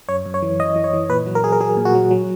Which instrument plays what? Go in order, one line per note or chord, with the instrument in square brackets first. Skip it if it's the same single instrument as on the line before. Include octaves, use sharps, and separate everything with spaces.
[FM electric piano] F#2 C#5
F#2
C#5
E3
F#2 D#5
E3
C#5
E3
A#2 B4
F#3
A#4
F#3 G#4
A#4
F#3 G#4
A#2
F#4
F#3
F#3